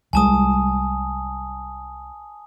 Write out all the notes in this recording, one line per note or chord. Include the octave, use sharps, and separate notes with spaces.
C2 G3 G#3 G#5 A5 D#6